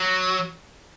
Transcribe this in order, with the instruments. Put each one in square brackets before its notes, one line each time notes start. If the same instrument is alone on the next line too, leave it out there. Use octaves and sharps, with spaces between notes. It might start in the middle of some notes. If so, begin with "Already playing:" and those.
Already playing: [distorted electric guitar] F#3